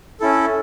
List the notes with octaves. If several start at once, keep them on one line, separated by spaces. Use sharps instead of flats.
C#4 E4 A4